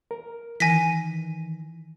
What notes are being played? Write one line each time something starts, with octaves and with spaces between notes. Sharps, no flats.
A#4
D#3 E3 G#5 A#6 B6